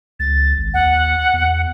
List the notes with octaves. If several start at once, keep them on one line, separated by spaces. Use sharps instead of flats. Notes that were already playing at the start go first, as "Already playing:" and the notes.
C#2 A6
G#1
D#2 F#5
E2